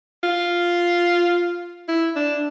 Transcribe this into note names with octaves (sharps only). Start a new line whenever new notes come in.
F4
E4
D4